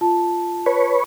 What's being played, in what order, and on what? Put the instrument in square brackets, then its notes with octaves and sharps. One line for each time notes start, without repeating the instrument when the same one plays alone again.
[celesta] F4 A5
[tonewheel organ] B4 C#5